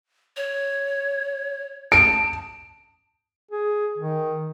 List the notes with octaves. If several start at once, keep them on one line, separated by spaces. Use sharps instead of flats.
C#5
A5 D7
G#4
D#3